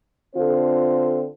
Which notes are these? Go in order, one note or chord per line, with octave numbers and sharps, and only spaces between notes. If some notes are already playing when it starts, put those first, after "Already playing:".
D3 C4 F4 A4 C5